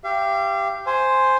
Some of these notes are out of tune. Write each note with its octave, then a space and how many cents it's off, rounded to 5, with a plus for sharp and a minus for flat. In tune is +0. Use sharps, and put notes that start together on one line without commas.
G4 +0 F5 -40
C5 +0 G#5 +0